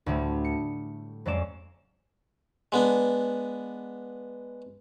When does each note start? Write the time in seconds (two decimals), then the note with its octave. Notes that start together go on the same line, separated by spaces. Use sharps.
0.06 D2 A2 G3 A3
0.45 C#7
1.25 F2 F#3 G#3 C#4 D5 E7
2.72 G#3 B3 D4